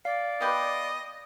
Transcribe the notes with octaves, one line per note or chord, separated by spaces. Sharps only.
D5 F5
B3 G4 B4 D#5